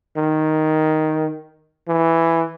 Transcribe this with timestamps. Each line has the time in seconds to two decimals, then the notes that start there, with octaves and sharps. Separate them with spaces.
0.17 D#3
1.88 E3